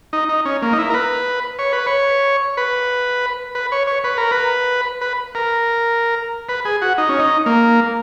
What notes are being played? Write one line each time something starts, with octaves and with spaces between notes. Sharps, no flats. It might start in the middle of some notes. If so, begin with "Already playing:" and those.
D#4
D#4
C#4
A#3
D#4
E4
A#4
B4
C#5
B4
C#5
B4
B4
C#5
C#5
B4
A#4
B4
B4
A#4
B4
G#4
F#4
D#4
C#4
D#4
A#3